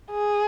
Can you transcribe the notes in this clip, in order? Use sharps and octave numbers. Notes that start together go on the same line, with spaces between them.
G#4